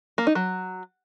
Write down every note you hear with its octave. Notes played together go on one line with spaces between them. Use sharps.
A#3
D#4
F#3